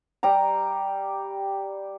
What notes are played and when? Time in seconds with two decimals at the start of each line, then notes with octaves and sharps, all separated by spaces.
0.23 G3 G4 A#5